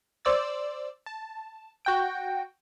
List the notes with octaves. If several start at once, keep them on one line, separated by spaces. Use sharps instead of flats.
C5 D5 E6 A6
A5
F#4 G5 D7